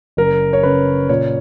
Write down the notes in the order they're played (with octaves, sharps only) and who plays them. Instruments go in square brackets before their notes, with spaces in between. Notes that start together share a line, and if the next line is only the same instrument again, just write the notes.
[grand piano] F#1 A#4
C#5
C#3 B4
A#2 C#5